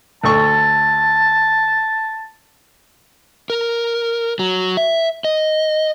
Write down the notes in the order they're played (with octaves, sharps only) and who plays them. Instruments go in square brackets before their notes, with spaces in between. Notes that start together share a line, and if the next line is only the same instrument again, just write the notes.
[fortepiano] D2 A4 C#6 [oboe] A5
[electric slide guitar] A#4
F#3
E5
D#5